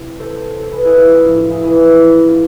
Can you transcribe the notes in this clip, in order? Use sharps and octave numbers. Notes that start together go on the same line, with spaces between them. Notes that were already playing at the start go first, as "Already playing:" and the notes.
Already playing: C3 E3
A4 C5
A4
G#4 B4
E4 G#4
F4 A4
E4 G#4
A2 F3 D4 F4
D4 F4
E4 G#4
G#4 B4
E4 G#4
D4 F4